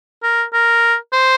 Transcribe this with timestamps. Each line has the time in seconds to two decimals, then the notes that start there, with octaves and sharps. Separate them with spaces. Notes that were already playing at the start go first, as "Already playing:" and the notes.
0.23 A#4
0.53 A#4
1.13 C5